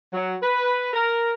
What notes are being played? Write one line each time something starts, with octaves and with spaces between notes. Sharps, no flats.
F#3
B4
A#4